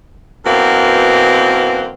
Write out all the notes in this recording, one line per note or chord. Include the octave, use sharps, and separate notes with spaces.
F#2 B2 E3 A#3 C4 F#4